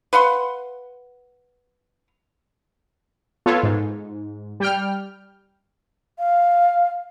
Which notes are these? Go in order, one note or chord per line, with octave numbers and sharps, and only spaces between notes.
B4 F5 F#5 C6
B3 F4 A4 C#5
G#2
G3 G5 F6
F5